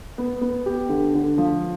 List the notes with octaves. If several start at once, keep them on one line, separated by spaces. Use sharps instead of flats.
B3
B3
G4
D3
D3
F3